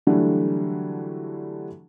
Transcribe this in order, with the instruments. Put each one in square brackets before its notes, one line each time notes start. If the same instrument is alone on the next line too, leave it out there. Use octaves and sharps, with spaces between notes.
[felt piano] D3 E3 F#3 G3 A3 D4